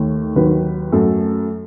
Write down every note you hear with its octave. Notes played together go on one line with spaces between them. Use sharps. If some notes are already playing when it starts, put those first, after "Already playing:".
Already playing: D#2 D#3 A3
D#2 D#3 F#3 B4
F#2 F#3 A3 A4